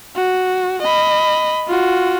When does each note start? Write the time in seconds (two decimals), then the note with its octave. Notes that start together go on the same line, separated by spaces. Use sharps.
0.16 F#4
0.82 D#5 B5
1.68 F4 F#4